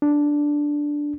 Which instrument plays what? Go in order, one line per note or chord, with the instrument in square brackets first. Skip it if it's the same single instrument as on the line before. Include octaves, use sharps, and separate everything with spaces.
[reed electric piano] D4